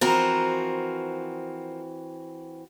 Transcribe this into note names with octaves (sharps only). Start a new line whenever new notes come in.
E3 F3 C4 F#4 A#4